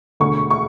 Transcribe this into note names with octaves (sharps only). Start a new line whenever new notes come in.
E1 D2 D3 A3 C#6
C#6